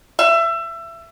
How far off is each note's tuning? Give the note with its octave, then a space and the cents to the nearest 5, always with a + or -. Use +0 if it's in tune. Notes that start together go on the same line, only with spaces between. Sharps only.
E5 +25